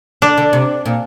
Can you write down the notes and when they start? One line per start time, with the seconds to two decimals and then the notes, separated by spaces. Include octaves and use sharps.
0.22 D3 D4
0.38 D3
0.53 C3
0.86 A#2